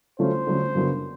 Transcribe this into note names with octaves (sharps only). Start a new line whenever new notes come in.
D3 F#3 A3 C#4 F4 C5
D3 F#3 A3 C#4 F4
F#2 C#3 F#3 B3 D4